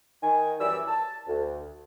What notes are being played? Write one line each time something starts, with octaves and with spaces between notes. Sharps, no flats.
D#3 G#5
F#2 E3 G3 D5 E5 E6
A5
D2